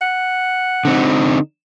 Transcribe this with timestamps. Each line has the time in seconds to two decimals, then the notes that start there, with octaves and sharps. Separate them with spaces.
0.02 F#5
0.85 D3 C4 D#4